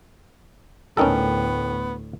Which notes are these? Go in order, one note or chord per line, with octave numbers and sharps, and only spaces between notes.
D2 A2 B3 C#4 D#4 A4 A#4 G5